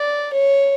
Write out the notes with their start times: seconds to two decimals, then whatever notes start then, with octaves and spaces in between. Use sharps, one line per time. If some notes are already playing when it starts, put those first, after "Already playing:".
Already playing: D5
0.33 C#5